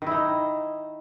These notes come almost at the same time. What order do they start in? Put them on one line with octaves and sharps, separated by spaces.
D#3 E4 D#4